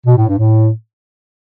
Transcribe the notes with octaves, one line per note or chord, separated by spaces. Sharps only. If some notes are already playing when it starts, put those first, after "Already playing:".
B2
A2
G2
A2